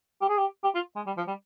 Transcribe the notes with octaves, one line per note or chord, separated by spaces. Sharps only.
G4
G#4
G4
G4
F4
G#3
G3
F3
G3